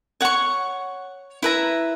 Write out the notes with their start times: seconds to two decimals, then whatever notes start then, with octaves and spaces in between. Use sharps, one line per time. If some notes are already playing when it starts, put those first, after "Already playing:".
0.21 C#5 F#5 C#6
1.42 E4 B4 E5 A#5